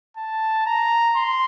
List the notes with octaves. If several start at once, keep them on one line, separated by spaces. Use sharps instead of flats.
A5
A#5
C6